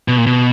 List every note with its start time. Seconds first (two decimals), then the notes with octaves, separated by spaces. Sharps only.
0.08 B2
0.18 A#2
0.27 B2